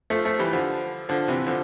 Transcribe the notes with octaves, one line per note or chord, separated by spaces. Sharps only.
F3 A3
F3 A3
E3 G3
D3 F3
D3 F3
C3 E3
D3 F3